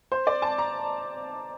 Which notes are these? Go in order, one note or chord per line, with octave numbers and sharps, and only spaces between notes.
C5
D5
A5
A#5